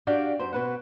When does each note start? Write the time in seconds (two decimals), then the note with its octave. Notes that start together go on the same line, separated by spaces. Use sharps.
0.07 D4 F#4 G4 D5 F5 G5
0.39 F#2 C5
0.53 B2 B4 F#5